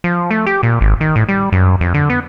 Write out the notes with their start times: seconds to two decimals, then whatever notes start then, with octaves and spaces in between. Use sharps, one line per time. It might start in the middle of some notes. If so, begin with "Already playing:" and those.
0.04 F3
0.31 A3
0.46 G4
0.63 A#2
0.81 G#1
1.01 D#3
1.16 A2
1.29 G3
1.52 F#2
1.81 F2
1.94 D3
2.10 B3